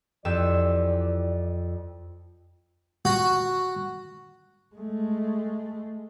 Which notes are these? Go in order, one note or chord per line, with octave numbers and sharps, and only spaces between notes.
F2 E3 G4 D5 E6
F#4
G#3 A3